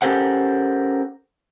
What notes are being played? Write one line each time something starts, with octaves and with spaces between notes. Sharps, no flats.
C#4 G4 A4 A#4 C5 F#5